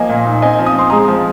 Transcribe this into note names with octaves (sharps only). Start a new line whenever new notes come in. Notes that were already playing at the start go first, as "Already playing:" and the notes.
Already playing: F3 A#3 D#5 G#5
A#2
D#4
C4 D#5 G#5
F3
D#6
C4 C6
G#3 A#5 D#6
F3